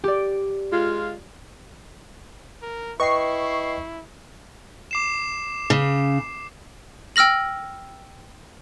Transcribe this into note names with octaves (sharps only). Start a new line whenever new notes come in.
G4 D5
G#3 F4
A#4
E4 B4 D#5 G5 C#6 C7
D6 C7 E7
C#3
G5 E6 F6 A#6 F#7